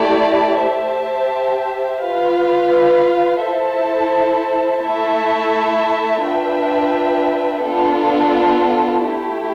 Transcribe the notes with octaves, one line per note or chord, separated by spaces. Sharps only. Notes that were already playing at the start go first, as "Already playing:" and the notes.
Already playing: A3 E4 G4 D5 A5
G4 C5 E5 A5
F4 B4 F5
E4 A4 C5 E5 A5
A3 E4 A4 E5 A5
D4 F4 B4 E5 G5
B3 D4 F4 A4
A3 E4 G4